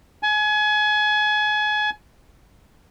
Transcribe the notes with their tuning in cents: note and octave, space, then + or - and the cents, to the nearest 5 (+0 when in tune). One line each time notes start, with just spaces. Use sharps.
G#5 +30